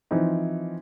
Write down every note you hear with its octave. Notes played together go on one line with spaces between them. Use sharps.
E3 F3 C4 D#4